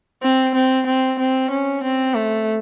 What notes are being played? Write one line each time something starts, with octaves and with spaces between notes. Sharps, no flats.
C4
C4
C4
C4
C#4
C4
A3